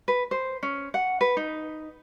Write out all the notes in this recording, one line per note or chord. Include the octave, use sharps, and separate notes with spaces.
B4
C5
C#4
F#5
B4
D#4